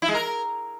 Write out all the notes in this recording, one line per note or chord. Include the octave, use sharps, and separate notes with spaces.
E4
G#3
A#4